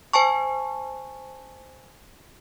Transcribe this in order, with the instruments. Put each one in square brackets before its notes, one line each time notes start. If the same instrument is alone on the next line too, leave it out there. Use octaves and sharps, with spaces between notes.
[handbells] C5 G#5 A5 C#6